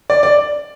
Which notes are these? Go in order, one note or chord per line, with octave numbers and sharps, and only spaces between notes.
D5
D5